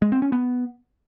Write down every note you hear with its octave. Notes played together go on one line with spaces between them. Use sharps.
G#3
C4
C#4
B3